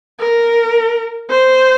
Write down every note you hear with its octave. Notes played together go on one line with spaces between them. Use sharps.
A#4
C5